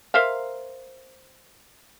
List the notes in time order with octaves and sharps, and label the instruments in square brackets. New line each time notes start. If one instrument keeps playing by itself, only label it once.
[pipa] A#4 C5 E5 F5